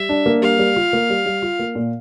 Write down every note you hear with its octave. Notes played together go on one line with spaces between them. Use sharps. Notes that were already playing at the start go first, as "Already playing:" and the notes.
Already playing: G3 E5
D4
A#3
G3 F5
G3
F4
A#3
G3
G3
F4
A#3
A#2